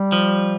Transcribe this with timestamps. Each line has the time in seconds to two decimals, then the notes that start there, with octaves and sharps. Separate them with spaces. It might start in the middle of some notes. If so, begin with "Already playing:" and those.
Already playing: G3
0.12 F3